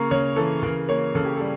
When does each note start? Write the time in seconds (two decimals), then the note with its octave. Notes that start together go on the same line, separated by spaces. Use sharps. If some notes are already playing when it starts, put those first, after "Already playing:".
Already playing: C#3 A#3 A#5 C#6
0.11 C#3 C#5
0.36 E3 A4
0.63 C#3 A#4
0.88 A#3 C#5
1.15 C#3 A4
1.25 G4
1.37 G3 A4